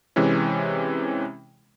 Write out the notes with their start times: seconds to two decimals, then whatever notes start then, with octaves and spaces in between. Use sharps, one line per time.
0.16 C3 E3 G#3 C#4